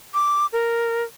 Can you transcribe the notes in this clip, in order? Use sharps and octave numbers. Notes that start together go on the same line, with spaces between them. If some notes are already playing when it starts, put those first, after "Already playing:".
D6
A#4